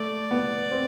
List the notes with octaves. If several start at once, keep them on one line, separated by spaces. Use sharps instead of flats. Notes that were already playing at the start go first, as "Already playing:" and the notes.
Already playing: A3 D5
B3
C4